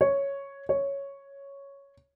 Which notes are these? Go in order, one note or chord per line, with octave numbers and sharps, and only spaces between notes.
C#5
C#5